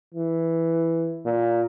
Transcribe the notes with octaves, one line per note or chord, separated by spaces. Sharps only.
E3
A#2